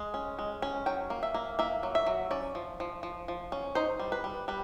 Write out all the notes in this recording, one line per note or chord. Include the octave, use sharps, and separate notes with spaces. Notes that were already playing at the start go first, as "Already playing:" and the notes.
Already playing: G#3
C#4
G#3
C#4
F#3 G5
A#3
E5
A#3
A#3 E5
F#3
E5
F#3
C#4 D5
F3
F3
F3
F3
C#4
D#4 C5
G3
B4
G3
G3 B4